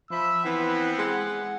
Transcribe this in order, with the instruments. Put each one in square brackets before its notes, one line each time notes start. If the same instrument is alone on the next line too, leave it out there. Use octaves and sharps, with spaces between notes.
[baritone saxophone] F3 [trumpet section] E5 B5 [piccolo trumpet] E6
[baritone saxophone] E3 [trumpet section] B3 C4 [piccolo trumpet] F#5
[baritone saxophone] G#3